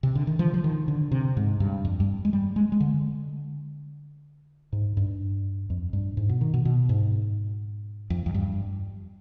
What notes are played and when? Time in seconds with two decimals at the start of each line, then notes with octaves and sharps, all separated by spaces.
0.03 C3
0.15 D3
0.27 D#3
0.39 F3
0.54 F3
0.64 D#3
0.88 D3
1.12 C3
1.37 G#2
1.60 G2
1.85 F2
2.00 G2
2.25 G#3
2.33 G3
2.56 G#3
2.72 G#3
2.80 D3
4.73 G#2
4.97 G2
5.70 F2
5.93 G2
6.17 G#2
6.29 B2
6.41 D#3
6.54 B2
6.65 B2
6.89 G#2
8.10 F2
8.26 F2
8.34 G2